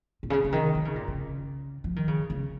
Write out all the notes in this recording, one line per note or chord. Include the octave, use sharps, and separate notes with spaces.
A#2
C#3
C#3
D#3
D#3
C#3
A#2
C#3
F3
D#3
C#3
C#3